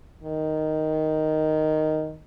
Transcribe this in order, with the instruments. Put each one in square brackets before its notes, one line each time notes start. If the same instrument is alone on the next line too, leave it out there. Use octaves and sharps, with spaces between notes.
[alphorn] D#3